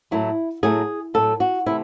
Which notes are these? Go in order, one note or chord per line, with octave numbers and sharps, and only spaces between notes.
A2 F#3 A3 E4
A2 F#3 A3 G#4
A2 F#3 A3 A4
F#4
C3 E3 A3 E4